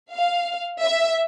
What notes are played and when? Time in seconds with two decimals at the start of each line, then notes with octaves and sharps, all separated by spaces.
0.14 F5
0.83 E5